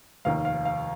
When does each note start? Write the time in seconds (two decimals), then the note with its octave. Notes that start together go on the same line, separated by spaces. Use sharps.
0.25 F1 D#2 D#3 F5
0.45 F5
0.65 F5